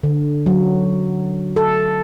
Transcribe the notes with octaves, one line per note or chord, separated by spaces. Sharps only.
D3
F#3
A4